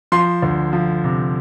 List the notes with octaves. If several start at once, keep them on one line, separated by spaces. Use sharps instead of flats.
F3 C6
D2
F3
C3